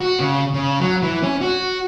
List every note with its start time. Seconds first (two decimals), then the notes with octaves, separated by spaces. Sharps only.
0.01 F#4
0.20 C#3
0.54 C#3
0.80 F#3
1.03 E3
1.23 C#4
1.41 F#4